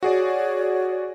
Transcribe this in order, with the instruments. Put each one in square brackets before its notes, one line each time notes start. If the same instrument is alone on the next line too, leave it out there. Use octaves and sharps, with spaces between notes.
[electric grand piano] F#4 G#4 D5 [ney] C#5